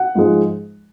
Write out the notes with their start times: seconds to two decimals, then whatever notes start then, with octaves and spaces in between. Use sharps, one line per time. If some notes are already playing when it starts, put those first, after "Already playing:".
Already playing: F#5
0.15 G#2 F3 G#3